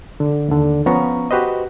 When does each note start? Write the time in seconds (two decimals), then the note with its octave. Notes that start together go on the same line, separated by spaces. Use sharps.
0.20 D3
0.49 D#2 D3
0.86 F3 B3 C#4 A#5 C#6
1.31 F#4 G4 B4 C5 D#5